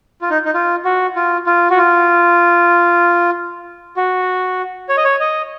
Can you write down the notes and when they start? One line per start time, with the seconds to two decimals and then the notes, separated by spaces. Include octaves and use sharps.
0.22 F4
0.30 D#4
0.45 D#4
0.54 F4
0.85 F#4
1.16 F4
1.47 F4
1.70 F#4
1.78 F4
3.97 F#4
4.89 C#5
4.97 D#5
5.04 C#5
5.20 D#5